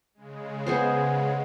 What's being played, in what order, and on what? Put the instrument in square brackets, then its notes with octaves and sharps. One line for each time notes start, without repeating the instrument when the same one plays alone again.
[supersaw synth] C#3 G#3
[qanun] B3 G#4 C5